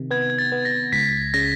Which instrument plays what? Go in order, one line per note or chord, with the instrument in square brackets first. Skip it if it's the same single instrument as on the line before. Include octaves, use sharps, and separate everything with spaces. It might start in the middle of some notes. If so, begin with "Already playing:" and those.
Already playing: [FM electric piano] C3 D#3
[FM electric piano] B3 [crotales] G#6
[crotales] G#6
A6
[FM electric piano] B3
[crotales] A#6
[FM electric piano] C#2 [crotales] B6
[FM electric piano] C#3 [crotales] A#6